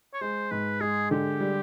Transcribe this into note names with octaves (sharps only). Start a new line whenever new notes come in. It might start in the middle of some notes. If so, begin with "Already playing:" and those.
C#5
G#3 C5
G#2 B4
G#3 G#4
D3 G4
G3